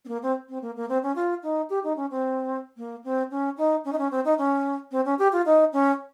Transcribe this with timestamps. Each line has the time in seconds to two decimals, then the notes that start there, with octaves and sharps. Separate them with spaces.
0.05 C4
0.08 A#3
0.22 C4
0.49 C4
0.62 A#3
0.76 A#3
0.89 C4
1.03 C#4
1.16 F4
1.43 D#4
1.70 G4
1.84 D#4
1.97 C#4
2.11 C4
2.77 A#3
3.04 C4
3.31 C#4
3.57 D#4
3.85 C#4
3.92 D#4
3.98 C#4
4.11 C4
4.25 D#4
4.38 C#4
4.91 C4
5.05 C#4
5.19 G4
5.32 F4
5.46 D#4
5.73 C#4